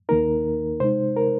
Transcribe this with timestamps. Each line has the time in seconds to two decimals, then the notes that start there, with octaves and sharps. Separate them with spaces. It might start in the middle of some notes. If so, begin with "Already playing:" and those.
0.09 D#2 D#3 A#3 D#4 A#4
0.80 C3 G#3 D#4 C5
1.17 A#4